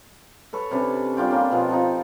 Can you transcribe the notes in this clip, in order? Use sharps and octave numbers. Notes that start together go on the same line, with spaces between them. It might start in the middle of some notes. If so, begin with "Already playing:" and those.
A4 B4 C#5
C3 C#4 D4 B4
G3 D4 F4 G5
C#3 A#3 F4 G4
B2 F3
F3 C4 D#4 F4